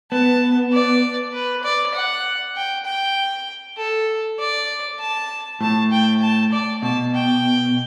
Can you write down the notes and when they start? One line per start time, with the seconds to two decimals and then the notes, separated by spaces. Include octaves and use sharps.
0.12 B3 A5
0.72 D5
1.33 B4
1.64 D5
1.95 F#5
2.56 G5
2.85 G5
3.77 A4
4.39 D5
5.00 A5
5.61 A2 A5
5.92 G5
6.22 A5
6.52 D5
6.83 B2 A5
7.14 G5